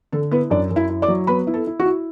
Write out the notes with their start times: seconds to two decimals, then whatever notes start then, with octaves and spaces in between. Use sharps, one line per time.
0.12 D3 A4
0.31 B3 E4 B4
0.50 F#2 D4 D5
0.71 F#2
0.76 E4 E5
0.89 E4
1.02 D5 D6
1.08 F#3
1.27 B3 B4 B5
1.47 E4
1.54 A4
1.67 E4
1.80 F#4
1.85 E4